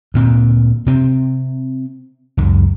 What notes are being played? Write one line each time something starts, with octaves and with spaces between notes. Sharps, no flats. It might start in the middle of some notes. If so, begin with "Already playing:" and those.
D2 A#2 C4
C3 C4
C#2 F#2